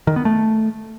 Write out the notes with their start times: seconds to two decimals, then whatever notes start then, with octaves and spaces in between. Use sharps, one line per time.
0.07 D#3
0.16 B3
0.25 A3